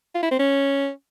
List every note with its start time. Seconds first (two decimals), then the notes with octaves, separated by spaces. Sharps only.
0.15 F4
0.23 E4
0.31 C4
0.39 C#4